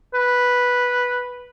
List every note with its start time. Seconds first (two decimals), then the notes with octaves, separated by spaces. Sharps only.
0.14 B4